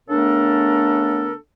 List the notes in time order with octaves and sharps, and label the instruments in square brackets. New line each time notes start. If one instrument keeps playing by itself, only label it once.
[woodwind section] C#3 A3 B3 D4 A4 A#4